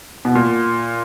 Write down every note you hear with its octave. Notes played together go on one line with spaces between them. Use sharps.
B2
A#2